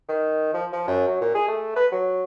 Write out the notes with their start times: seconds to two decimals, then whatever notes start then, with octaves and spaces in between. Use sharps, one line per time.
0.09 D#3
0.54 F3
0.73 F3
0.87 F#2
1.07 F#3
1.21 A#2
1.35 G#4
1.48 A3
1.76 B4
1.92 F#3